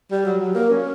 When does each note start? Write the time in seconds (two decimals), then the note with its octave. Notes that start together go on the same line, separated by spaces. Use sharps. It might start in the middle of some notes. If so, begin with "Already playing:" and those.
0.11 G3
0.26 F#3
0.40 F#3
0.55 A#3
0.70 C#4